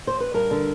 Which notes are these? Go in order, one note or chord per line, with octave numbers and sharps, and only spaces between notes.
C5
B4
G2 A#4
D3